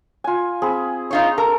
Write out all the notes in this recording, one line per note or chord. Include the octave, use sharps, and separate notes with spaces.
F4 G#5
C4 G#4 B5
D#4 F4 C#5
A4 A#4